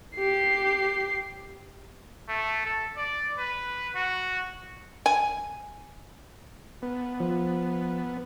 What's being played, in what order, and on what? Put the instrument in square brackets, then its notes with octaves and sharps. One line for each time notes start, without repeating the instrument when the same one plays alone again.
[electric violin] G4 C7
[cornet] A3
A4
D5
B4
F#4
[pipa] G#5
[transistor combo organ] B3
[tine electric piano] F3